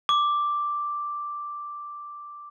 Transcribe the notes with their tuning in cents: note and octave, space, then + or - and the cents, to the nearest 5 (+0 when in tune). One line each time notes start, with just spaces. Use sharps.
D6 +0